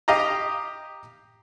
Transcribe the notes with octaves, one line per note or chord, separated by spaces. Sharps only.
G4 D#5 F5 A#5